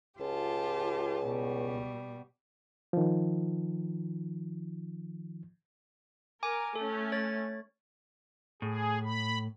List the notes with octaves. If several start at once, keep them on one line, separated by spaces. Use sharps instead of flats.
C#2 F4 G4 A5
B2 G3
D#3 F3
A#4 G#5 D6
A3 C#4 A4
C#5 A6
A2 G#4
B5